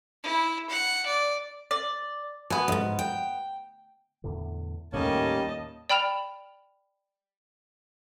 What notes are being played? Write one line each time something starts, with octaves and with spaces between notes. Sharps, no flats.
E4
F#5
D5
D5
B2 B3 G#5
D2 G#2
G5
E2 A2 D3
D#2 A2 G3 A3 A#3 C#4 D#5 A5
D5 G5 B5 F6 E7 F7